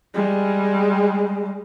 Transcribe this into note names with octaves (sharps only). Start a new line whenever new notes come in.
G3 G#3